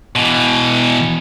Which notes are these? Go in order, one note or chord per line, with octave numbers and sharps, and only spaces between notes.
B2 E3